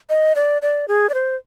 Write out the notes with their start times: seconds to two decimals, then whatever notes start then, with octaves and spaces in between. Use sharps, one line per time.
0.10 D#5
0.36 D5
0.62 D5
0.88 G#4
1.10 D5
1.14 C5